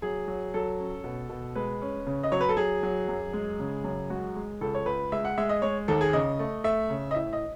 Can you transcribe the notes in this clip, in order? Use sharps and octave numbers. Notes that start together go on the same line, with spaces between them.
F#3 G#4
F#3
F#3 A4
C#4
B2
B2
G#3 B4
C#4
C#3
D#5
F#3 C#5
B4
A4
F#3 G#4
F#3
F#2
G#3
C#3
F#2
G#3 F#4
G#3
C#2 A4
C#5
C#2 B4
G#3 E5
F#5
G#3 E5
D#5
G#3 C#5
D#2 A4
G#4
C#3 D#5
A3
A3 E5
C#3
D#5
A2 E5
D#5